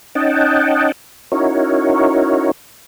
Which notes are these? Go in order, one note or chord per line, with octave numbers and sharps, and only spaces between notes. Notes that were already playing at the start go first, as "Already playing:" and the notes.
C#4 D#4 D#5 F#5 G5 A5
C#4 D#4 E4 F#4 A#4 C#5